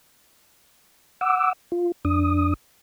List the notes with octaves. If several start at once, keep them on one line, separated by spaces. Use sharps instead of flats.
F#5 D6 E6
F4
F2 D4 D#6